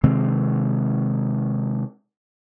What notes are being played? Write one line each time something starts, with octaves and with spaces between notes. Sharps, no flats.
C3 D#3 G#3 C4